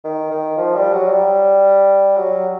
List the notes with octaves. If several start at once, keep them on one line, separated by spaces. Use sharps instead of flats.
D#3
D#3
F3
G3
F#3
G3
F#3